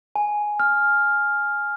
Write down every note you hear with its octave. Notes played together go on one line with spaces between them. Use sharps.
G#5
F6